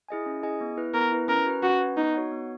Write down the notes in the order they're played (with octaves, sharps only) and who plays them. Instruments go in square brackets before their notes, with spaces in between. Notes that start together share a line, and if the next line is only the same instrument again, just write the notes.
[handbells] E4 G#4 D#5 G#5
C#4
E4 G#4 D#5 G#5
B3
E4 B4
[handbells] B3 [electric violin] A#4
[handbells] E4 B4
[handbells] C#4 [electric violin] A#4
[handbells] F#4 B4
[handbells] C#4 [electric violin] F#4
[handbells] F#4 B4
[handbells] B3 [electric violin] D#4
[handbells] F#4 C#5 F#5
B3